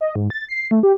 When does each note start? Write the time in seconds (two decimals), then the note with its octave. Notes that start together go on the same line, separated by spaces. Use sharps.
0.01 D#5
0.16 G#2
0.30 A6
0.49 C7
0.71 A3
0.83 G4